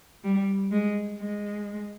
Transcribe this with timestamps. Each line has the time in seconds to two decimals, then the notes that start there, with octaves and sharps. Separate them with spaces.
0.24 G3
0.72 G#3
1.20 G#3